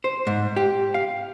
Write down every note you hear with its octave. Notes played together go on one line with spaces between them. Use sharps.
C5
G#2
G4
F5